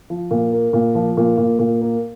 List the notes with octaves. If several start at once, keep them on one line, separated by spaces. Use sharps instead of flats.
F3
A#2
A#3
A#2
F3
A#2
A#2
A#2
A#3